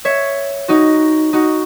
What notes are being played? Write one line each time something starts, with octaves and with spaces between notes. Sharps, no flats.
C#5 E5
D#4 F#4
D#4 F#4